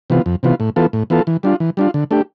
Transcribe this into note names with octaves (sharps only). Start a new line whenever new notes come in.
C3 E3 B3 F4
F2
C3 E3 B3 F4
A2
E3 B3 F4 A4
A2
E3 B3 F4 A4
E3
G3 D4 F4
E3
G3 D4 F4
D3
A3 D4 G4